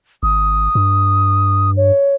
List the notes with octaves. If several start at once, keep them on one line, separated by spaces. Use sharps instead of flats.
G#1 D#6
G2
C#5